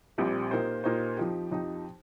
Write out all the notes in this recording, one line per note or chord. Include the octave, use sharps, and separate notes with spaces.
A#1 A#2 G3 C4 G4
A#2 A#3 D#4 G4 C5
A#2 A#3 D#4 G4 C5
F2 F3 D#4 G4
F2 F3 D#4 G4